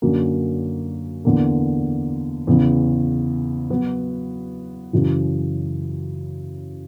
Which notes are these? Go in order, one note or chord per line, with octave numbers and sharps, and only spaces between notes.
F#2 D3 A#3 C#4 F#4
E2 D3 A#3
E2 C#3 E3
F#3 B3 F#4
F#2 C#3 E3